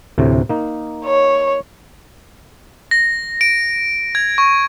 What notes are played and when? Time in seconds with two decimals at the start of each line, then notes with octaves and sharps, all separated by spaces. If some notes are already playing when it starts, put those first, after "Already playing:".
0.18 D2 A2 C3
0.49 A#3 D#4
1.05 C#5
2.91 A#6
3.41 D7
4.15 G#6
4.38 C#6